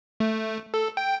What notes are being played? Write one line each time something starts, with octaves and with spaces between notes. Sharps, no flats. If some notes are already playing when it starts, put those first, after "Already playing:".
A3
A4
G5